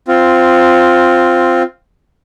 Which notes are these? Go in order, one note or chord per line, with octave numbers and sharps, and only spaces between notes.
C4 F4